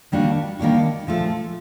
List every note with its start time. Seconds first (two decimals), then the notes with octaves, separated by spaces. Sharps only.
0.12 D#3 G3 A#3 D4 F#4
0.59 D#3 G3 A#3 D4 F#4
1.07 A#2 F3 A3